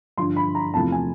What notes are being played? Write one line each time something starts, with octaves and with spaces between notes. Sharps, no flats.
G2 D3 F3 C6
B5
A#5
E2 C3 F3 A3 A5
G#5